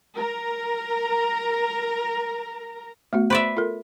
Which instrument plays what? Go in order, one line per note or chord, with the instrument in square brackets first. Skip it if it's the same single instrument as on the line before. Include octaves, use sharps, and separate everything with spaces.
[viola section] A#4 A#5
[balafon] A3 B3 F#4
[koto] B4 D5 E5 [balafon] C5 C6
[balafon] F4 A4 A#4